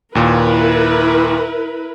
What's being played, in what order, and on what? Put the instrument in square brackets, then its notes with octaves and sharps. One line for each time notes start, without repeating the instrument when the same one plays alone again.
[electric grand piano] D#2 A#2 [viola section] E4 A#4 B4